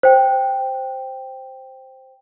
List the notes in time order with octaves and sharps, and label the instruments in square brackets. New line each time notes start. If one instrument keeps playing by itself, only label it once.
[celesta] C5 G5